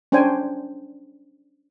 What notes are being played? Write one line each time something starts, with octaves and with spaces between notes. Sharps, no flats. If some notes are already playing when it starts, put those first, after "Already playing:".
C#4 D4 C5 G5 G#5